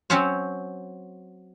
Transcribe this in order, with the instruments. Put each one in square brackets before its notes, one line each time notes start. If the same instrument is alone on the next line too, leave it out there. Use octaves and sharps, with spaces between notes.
[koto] F#3 C4 C#4 C5 C#5